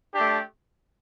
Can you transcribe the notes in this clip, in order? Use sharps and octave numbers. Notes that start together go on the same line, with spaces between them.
A3 D4 G4